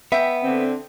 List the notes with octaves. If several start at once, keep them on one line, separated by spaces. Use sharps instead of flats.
B3 E5 G5
D3 C4